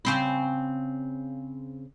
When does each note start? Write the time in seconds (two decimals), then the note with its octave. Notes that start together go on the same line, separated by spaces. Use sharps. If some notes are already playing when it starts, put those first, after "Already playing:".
0.05 C#3 C4 B4